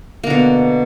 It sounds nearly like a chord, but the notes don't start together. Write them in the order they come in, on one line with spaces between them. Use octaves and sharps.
A#3 D3 B2